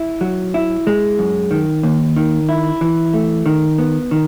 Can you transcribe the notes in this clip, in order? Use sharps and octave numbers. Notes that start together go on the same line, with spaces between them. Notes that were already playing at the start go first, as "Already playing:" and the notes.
Already playing: E4
F#3
E4
G#3
F#2
D#3
D#2
D#3
E4
E3
A3
D#3
B3
D#3